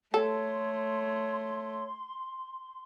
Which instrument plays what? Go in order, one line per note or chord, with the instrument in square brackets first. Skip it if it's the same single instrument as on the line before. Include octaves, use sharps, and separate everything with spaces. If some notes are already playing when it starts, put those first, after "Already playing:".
[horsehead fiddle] A3 [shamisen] A4 [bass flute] C#5 [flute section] C6